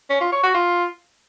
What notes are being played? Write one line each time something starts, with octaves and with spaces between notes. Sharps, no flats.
C#4
F4
C#5
F#4
F4